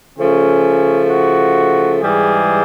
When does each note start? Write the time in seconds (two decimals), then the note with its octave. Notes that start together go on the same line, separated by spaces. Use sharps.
0.18 C#3 F3 A3 C#4
1.10 F#4
2.01 G#2 E3 G3 G#4